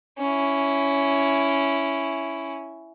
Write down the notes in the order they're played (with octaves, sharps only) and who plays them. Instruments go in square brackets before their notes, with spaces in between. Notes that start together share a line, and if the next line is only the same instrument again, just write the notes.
[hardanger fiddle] C#4 E4